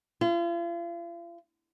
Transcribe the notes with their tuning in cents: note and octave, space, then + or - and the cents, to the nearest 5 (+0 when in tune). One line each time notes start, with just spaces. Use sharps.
F4 -40